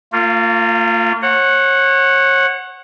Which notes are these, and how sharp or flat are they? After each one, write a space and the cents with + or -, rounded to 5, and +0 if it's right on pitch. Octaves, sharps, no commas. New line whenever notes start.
A#3 -40 F4 +0
C#5 -35 F#5 +0